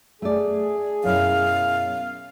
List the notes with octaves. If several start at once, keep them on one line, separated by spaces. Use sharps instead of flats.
A3 G#4 D5
F#2 B2 E4 F5